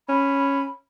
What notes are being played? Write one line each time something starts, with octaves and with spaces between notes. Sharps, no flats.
C#4 B5